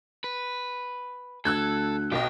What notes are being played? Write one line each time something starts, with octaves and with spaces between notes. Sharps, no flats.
B4
D2 A4 E6 F#6 G#6
B1 B2 G4 D#5